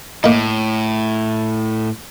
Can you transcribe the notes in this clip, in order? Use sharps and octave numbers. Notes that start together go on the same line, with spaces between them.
A2 A#3 D#4